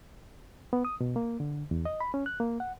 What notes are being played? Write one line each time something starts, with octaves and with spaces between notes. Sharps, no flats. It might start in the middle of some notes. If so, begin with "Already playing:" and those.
B3
D#6
B2
A#3
D3
E2
D#5
B5
C#4
F#6
A#3
F#5